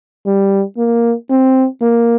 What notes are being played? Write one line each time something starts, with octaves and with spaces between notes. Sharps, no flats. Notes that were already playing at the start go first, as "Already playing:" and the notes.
G3
A#3
C4
A#3